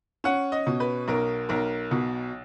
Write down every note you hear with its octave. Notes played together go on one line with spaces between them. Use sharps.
C#4 F#5
D#5
B2
B4
B1 A#4
B1 A#4
B2